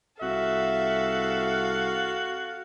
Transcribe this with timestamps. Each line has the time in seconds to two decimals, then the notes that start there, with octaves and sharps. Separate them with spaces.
0.22 C2 F#4 A4 E5 F5